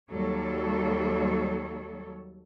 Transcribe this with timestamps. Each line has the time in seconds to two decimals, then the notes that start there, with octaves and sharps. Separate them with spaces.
0.11 D#2 F#3 G3 A4 C#5